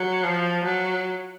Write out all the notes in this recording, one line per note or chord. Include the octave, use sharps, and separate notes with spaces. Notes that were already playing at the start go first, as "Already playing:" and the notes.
Already playing: F#3
F3
F#3